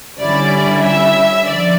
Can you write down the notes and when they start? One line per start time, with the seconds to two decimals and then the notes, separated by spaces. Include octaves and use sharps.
0.19 D3 G3 C#4 E4 D5
0.83 E5
1.47 D3 F3 D5